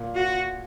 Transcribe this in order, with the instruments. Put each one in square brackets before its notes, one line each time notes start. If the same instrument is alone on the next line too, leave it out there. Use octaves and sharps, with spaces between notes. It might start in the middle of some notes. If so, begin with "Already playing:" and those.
Already playing: [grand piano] A#2
[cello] F#4